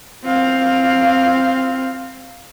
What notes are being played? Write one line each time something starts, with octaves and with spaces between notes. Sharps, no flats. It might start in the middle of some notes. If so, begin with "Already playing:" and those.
C4 F5